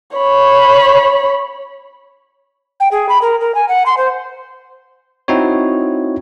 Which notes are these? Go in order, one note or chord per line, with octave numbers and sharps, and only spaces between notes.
C#5 B5
G5
G#4
B5
A#4
A#4
G#5
F#5
C6
C5
C4 D#4 E4 F#4 C#5